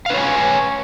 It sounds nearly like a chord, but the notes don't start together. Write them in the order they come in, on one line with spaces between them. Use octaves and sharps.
F5 B4 C#5 G#5